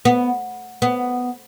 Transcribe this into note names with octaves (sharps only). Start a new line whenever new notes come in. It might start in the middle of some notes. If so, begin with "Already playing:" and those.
B3
B3